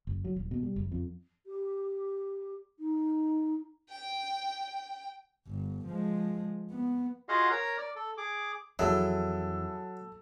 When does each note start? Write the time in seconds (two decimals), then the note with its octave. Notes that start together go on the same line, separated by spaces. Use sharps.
0.07 F#1
0.25 F#3
0.36 D#1
0.51 B2
0.63 G3
0.76 F#1
0.92 F2
1.46 G4
2.79 D#4
3.89 G5
5.48 G1
5.87 F3 G#3
6.71 B3
7.29 F4 F#4 G#4 D#5 F5 F#5
7.51 A#4 C#5 A#5
7.78 D5
7.96 A4
8.17 G#4 D6
8.79 F2 E3 F#3 E4 G#4 A4 A5 E6